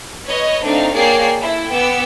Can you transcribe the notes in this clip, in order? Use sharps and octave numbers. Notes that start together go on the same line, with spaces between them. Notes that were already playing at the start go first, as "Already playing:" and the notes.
B4 C#5 D#5
A3 C4 D4 D#4 F5
A#3 G#4 C#5 D5 G5 C7
E4 A4 E5
B3 G5 D6 E6